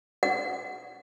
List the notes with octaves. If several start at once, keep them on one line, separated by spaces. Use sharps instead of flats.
F#5